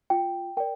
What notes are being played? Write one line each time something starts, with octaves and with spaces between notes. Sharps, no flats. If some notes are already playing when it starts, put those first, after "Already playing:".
F4 G5
A#4 D5 G5